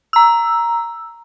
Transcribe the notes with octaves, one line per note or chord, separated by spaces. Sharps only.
A#5 E6